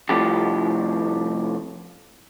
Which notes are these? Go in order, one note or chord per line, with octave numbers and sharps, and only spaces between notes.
C2 F2 A2 F3 G4